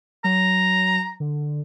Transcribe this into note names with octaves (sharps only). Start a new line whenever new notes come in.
F#3 A#5
D3